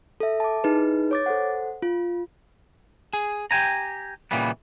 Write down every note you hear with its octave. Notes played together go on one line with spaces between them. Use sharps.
A4 E5
A5 D6
D#4 E4 G#4 B4
C#5 D6 A6
A4 C5 F#5
F4
G#4
G4 G5 G#5 A#5
A#2 C#3 E3 G3 B3